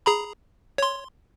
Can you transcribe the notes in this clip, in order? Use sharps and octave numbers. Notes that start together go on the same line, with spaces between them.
G#4 A#5 B5
C#5 C6